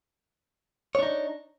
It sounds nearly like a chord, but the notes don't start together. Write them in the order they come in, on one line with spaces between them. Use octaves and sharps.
C#5 D4 D#4